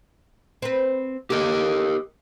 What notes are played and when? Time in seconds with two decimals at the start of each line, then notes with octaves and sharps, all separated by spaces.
0.62 C4 B4
1.30 D3 A#3 G4 A#4 D#5